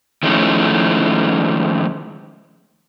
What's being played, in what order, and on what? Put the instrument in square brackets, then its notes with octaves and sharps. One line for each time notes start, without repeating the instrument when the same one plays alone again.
[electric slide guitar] D#3 F3 G#3 A3 C#4 E4